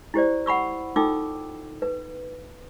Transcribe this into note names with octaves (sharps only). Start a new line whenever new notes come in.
E4 G4 C5 D5
F#5 B5 C#6 E6
D#4 F4 A4 G5 D6 E6
B4